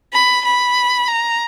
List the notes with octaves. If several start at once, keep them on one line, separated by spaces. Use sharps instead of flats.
B5
B5
A#5